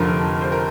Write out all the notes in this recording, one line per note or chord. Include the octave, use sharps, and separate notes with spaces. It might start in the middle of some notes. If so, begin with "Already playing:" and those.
Already playing: F1 F2 D3 F3 A#4
C5
A#4